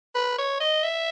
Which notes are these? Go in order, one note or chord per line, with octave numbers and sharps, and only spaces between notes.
B4
C#5
D#5
E5